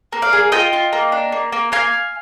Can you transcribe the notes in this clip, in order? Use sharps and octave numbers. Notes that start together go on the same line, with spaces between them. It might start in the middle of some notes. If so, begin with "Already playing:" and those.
A#3
D5 F5
G#4
F4 D#5 G5
F4
A#3
D4
A#3
A#3
A#3 F5 G#5